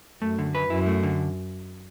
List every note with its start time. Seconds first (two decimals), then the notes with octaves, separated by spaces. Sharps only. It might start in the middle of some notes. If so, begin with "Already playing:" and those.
0.22 F#2 A3
0.39 D3
0.55 B4
0.70 F#2 E4
0.87 A3
1.03 D3